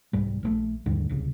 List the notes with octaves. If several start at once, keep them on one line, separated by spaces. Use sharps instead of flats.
C2 G#2 G3
A#1 F#3 A3
D#2 G#2 D3 G3
D1 C2 C#3